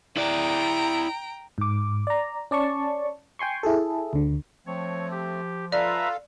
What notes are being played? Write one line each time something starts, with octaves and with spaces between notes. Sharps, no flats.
E4 D5 G5 A#5
G#2 D6
D5 A#5
C#4 D5 A5 C#6
G5 G#5 C6 C#6
E4 G#4 A4
D2 D3
F3 A3 C4 C#5
G4
F4 A4 B4 D5 E5 F5 A#5